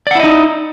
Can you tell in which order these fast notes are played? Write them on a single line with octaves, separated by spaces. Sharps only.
D5 F#5 E4 D#5 D#4